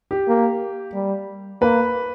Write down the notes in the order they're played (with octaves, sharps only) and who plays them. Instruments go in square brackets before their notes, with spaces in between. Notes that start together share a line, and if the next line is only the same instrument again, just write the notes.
[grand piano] G4
[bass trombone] A#3
G3
[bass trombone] A#3 [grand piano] B4